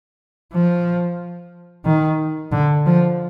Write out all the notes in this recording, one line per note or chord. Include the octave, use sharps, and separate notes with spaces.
F3
D#3
D3
F3